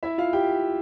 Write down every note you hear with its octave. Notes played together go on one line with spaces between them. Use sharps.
E4 E5
F4 F5
G4 G5